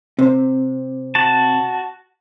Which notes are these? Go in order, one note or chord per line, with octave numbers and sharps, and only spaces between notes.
C3 C4 C5
F#4 A5